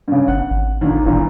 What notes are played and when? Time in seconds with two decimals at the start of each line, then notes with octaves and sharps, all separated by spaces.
0.08 G2 C#3
0.28 G1 F#5
0.51 G#1
0.81 D#2 A#2 D3
1.05 E1 G2 A#2 E3